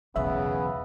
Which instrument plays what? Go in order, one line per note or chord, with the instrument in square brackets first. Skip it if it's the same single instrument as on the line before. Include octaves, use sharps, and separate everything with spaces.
[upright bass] B1 E2 [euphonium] C#3 [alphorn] B3 [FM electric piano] E5